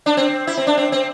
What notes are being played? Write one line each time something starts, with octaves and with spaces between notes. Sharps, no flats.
D4
C4
E4
C4
D4
C4
C4